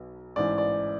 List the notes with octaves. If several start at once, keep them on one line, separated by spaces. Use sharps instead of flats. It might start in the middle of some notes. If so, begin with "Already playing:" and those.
Already playing: B1 B2
A1 G#2 E3 D5
D5